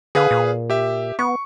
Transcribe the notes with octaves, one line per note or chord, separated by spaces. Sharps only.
D3 G#4 B4 F5
A#2
G4 E5
B3 C#6